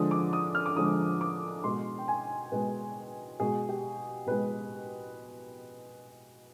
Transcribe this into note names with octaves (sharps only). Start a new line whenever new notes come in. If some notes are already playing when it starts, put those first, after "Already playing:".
Already playing: D3 F3 G#3 D#6
D6
D#6
F6
D6
D3 F3 G#3 D#6
D6
B2 G#3 C6
G5
G#5
B2 G#3 B4
B2 G#3 G#4
G4
B2 G#3 B4